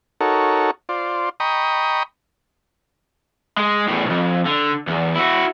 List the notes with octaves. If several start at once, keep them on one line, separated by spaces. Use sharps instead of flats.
D#4 F#4 A4 A#4 C#5
F4 C5 D5
D#5 G5 A#5 B5 C#6 D#6
G#3
E2 A2
B1 F2
D3
E2
E4 F#4